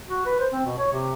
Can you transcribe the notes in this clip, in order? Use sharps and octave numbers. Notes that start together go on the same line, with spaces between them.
F#4
B4
C5
C4
B2
C#5
C3